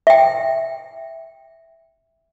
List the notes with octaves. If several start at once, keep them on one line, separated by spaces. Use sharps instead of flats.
E5 G5